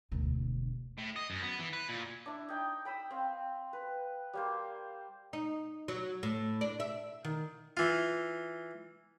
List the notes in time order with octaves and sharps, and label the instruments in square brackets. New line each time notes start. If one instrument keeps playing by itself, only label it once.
[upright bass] E1 D2
[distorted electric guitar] A2
D#5
F#2
B3
E3
B4
A#2
[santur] D4 E4
D#4 G5
G5 B5 D#6 E6
C4 F5
B4
G3 A#3 C5
[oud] D#4
F#3
A2
D4
E5
D#3
[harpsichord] E3 F4